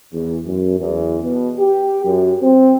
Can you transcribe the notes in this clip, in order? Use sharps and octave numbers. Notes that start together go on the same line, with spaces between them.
E2
F#2
E2
B2
G4
F#2
C4